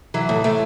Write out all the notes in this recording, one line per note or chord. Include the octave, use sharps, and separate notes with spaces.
E3 F#3
A2
A2 A3